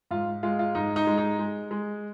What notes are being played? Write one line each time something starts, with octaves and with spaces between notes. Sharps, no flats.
G#2 F4
G#3 F4
F4
G#2 D#4
D#4
G#3
D#4
G#3
G#3